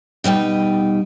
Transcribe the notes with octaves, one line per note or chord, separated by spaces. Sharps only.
B2 G3 D#4 G5